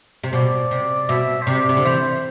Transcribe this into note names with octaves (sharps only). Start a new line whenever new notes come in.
C3
B2 D5
C3
B2 E5
C5
C3 D5
C3
D3
E3 C5